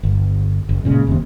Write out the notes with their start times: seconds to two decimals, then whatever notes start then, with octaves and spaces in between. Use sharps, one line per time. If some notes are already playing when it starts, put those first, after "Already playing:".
0.03 G1
0.69 F#1
0.84 C#2 A#2 C#3 G#3
1.07 F#1 D#2 C3